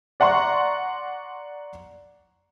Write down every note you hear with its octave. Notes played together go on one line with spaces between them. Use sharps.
D5 F#5 A#5 C6 C#6